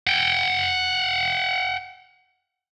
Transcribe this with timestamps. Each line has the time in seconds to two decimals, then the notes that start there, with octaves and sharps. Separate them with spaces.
0.07 F#5 G5